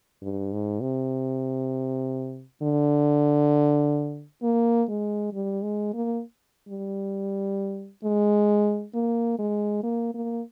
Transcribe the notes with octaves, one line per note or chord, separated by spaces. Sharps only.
G2
G#2
C3
D3
A#3
G#3
G3
G#3
A#3
G3
G#3
A#3
G#3
A#3
A#3